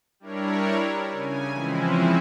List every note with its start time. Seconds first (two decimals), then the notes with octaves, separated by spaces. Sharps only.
0.20 G3 D4 E4 A#4 C#5
1.11 C#3 G#5
1.53 E3 F3 G#3 C4 C#4 E4